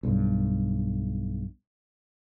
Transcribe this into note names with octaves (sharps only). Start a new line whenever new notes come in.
B1 G2